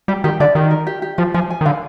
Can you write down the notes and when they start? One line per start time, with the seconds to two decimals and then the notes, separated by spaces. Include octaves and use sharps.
0.08 G3 G4
0.24 D#3 G4
0.40 D3 D5
0.55 D#3 G4
0.71 A#4
0.87 G4
1.02 G4
1.18 F3 F4
1.34 F3 G#5
1.50 G#5
1.61 D#3
1.65 D3 F5